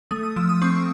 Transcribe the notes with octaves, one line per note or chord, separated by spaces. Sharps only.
A3 D#6
D#6
F3 E6
D#6
C4 C#6